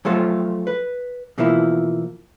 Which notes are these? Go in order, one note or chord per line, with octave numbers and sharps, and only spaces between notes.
F3 F#3 A3 F4 A4 C5
B4
B2 E3 F3 A#3 E4